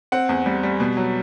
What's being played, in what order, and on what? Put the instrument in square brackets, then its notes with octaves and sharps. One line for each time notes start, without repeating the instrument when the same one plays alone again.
[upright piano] C4 F#5
E2
G3
G3
B2
F#3